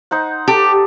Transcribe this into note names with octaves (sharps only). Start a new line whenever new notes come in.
D#4 C5 F#5
G4 A4